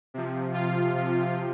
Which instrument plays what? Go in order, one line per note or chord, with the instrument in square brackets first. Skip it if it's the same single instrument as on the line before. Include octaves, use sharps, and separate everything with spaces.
[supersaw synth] C3 F3
F4
C3 F3